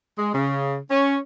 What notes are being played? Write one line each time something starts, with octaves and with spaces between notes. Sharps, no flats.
G#3
C#3
C#4